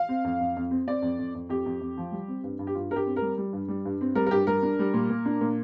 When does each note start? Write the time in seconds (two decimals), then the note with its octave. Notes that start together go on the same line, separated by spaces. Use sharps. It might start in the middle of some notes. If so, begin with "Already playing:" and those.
Already playing: F5
0.09 C4
0.24 F2
0.40 F2
0.56 F2
0.71 C4
0.88 C4 D5
1.02 F2
1.19 F2
1.34 F2
1.49 F2 G4
1.66 F2
1.81 F2
1.97 F3
2.12 G3
2.28 C4
2.44 G2
2.59 G2
2.67 G4
2.74 G2 F4
2.91 G2 A#4
2.96 G4
3.06 C4
3.16 A#4
3.22 G3
3.38 G3
3.53 G2
3.68 G3
3.85 G2
4.01 C4
4.15 G3 A#4
4.26 A#4
4.31 G2 G4
4.47 G3 A#4
4.63 D4
4.79 G3
4.94 A#2
5.10 A#2
5.26 D4
5.41 A#2